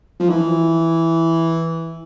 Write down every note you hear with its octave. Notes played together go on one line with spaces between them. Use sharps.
F3
E3